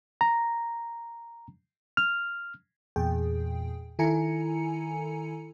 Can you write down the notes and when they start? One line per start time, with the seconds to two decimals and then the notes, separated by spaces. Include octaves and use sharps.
0.21 A#5
1.97 F6
2.96 E2 A#2 G#4 G5
3.99 D#3 E4 A4 G#5 A#5 C#7